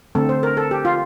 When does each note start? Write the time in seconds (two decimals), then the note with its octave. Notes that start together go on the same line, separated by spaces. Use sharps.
0.15 D3 A3 C4 A4
0.29 C5
0.43 A#4
0.57 A4
0.71 G4
0.85 F4